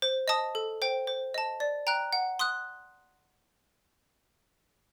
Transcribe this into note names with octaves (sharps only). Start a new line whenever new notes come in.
C5
D#5 A5 D#6
A4
C5 G5
C5
D#5 A5
D5
G5 A#5 F#6
F#5
C6 D#6 F#6